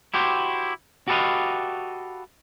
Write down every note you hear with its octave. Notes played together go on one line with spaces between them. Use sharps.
E4 F#4 G4 C5
F#4 G4 A4 B4 D#5 F5